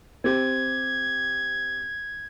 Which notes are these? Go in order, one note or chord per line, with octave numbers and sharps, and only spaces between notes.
C4 G4 G#6